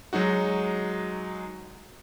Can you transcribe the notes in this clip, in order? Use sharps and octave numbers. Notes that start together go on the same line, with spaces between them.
F#3 G#3 D#4 F#4